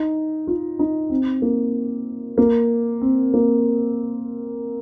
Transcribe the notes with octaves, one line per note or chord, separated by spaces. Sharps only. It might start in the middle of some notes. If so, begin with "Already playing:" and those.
Already playing: D#4
F4
D#4
C4
A#3
A#3
C4
A#3